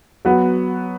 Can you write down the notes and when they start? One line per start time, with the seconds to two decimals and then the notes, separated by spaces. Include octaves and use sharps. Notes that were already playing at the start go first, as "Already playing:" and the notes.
0.25 F#3 B3 F#4